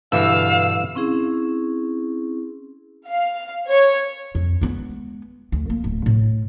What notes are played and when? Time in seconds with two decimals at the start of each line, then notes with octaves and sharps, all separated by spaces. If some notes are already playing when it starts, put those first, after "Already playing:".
0.12 G2 B2 D3 E3 G3 F5 E6
0.95 C4 C#4 E4 G#4
3.10 F5
3.68 C#5
4.35 F2
4.61 G#3 B3
5.52 D2
5.70 A#3
5.84 D1
6.06 A2